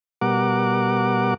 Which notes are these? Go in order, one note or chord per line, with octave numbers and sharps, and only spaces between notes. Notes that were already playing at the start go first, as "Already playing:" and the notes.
B2 G3 A#4 F#5 D6